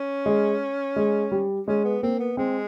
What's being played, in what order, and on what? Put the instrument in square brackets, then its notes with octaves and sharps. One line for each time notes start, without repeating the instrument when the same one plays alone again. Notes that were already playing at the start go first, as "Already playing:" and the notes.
Already playing: [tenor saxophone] C#4
[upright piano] G#3
G#3
G3
[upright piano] G#3 [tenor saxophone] C#4
[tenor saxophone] B3
[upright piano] A#3 [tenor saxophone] C4
[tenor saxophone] B3
[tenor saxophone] G#3 [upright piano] C4